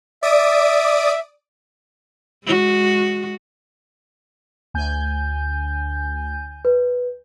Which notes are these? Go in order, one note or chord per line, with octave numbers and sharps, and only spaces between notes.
D5 E5 D#6 D7
G#3 F#4
D2 G#5 G6
B4